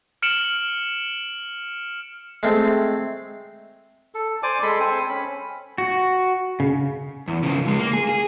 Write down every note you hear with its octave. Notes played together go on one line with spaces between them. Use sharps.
F6 C#7 D7 E7 F#7
G#3 A3 C4
A4
C5 D5 G#5 D6
G#3 A4 B5 C6
C4 A4 C5 G#5
C#4 B5
F#4
C#3
E2
C#3 F3
C#2 G#3
A#3
G#4
G#4